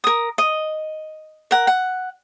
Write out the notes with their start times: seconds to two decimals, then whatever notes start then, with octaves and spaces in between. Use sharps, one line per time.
0.04 A#4 D#6
0.38 D#5
1.51 A#4 F#5
1.67 F#5